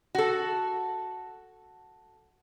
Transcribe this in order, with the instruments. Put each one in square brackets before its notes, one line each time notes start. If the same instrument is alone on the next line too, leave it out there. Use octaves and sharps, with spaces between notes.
[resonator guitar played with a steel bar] F#4 A4